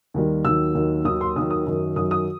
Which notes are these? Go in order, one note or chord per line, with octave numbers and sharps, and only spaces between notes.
D#2 D#3 G3
D#2 D#3 F#3 E6
D#2 D#3 F#3
D#2 D#3 F#3 D#6
C6
D#2 D#3 F#3 D#6
D#6
F#2 D#3 F#3
F#2 D#3 F#3 D#6
D#6